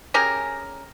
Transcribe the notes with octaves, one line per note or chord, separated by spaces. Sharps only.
C#4 G4 G#4 A#4